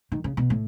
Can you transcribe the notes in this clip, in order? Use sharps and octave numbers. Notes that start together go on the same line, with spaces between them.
D#3
C#3
B2
A2